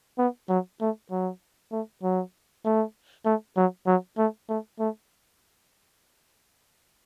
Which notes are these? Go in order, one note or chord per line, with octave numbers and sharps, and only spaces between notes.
B3
F#3
A3
F#3
A3
F#3
A3
A3
F#3
F#3
A3
A3
A3